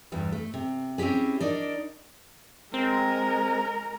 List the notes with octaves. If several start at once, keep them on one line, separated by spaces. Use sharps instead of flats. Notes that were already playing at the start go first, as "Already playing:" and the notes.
E2 G2 G3
A3
C3
C4 C#4 E4 G4 G#4
D4 D#4 A#4 D5
G#3 C4 A#4